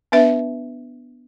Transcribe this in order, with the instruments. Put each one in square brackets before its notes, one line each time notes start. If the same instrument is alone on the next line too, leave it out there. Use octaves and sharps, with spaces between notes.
[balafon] B3 D4 B4 E5